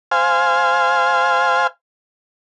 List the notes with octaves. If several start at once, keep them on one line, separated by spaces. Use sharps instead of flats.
C5 F5 G#5